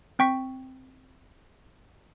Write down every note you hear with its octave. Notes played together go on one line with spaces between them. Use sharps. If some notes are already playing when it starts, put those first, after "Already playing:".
C4 G5 C#6 B6